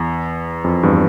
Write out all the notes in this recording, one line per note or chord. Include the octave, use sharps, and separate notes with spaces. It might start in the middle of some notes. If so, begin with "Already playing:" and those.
Already playing: E2
F2
E2 G2